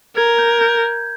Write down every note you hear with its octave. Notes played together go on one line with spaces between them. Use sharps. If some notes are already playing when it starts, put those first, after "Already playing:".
A#4 G#6
G6
G6